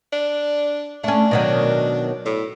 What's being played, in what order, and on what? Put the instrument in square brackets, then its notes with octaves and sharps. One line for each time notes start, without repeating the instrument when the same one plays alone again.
[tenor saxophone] D4
[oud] A3 C#4 [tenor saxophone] D4
[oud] B2 D#3 F#3
[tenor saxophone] A2